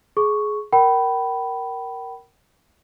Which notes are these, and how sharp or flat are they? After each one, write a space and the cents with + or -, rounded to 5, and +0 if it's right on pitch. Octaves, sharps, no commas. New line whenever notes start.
G#4 +20 C#6 +0
A#4 +0 G5 -35 B5 +0